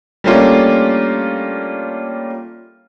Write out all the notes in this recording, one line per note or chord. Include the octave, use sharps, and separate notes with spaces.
G3 A3 A#3 C#4 D4 F4